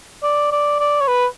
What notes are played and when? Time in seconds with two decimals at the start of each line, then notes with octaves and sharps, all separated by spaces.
0.23 D5
0.52 D5
0.80 D5
1.01 C#5
1.08 B4